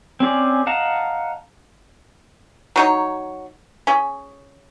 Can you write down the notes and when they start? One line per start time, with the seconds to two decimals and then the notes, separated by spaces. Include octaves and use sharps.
0.20 C4 C#4 G#4 D5
0.67 D#5 F5 F#5 A5 A#5
2.76 F#3 D#4 C#5
3.87 C#4 G#4